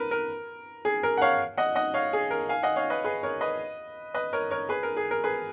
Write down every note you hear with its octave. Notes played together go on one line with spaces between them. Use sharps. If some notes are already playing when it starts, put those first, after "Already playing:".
Already playing: A#4 B4
A#4
G#4
A#4
F#5
C#5 F5
D#5 F#5
D#5 F#5
C#5 F5
G#4
A#4
F5 G#5
D#5 F#5
C#5 F5
B4 D#5
G#4 B4
A#4 C#5
B4 D#5
B4 D#5
A#4 C#5
A#4 C#5
G#4 B4
A#4
G#4
A#4
G#4 B4